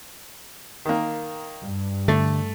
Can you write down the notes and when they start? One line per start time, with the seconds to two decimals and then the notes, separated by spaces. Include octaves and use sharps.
0.85 D#3 A#3
1.61 G2
2.08 D3 A3